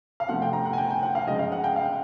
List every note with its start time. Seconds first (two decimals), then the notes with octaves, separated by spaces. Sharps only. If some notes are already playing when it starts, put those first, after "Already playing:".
0.20 F5
0.28 C3 F3 A3 F#5
0.42 G5
0.53 A#5
0.65 F#5
0.73 G#5
0.78 G5
0.91 G5
1.03 F#5
1.15 F5
1.27 C#3 F3 G#3 D#5
1.39 F5
1.52 F#5
1.64 G5
1.76 F5